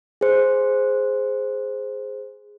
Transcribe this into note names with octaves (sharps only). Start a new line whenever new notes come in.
G#4 C5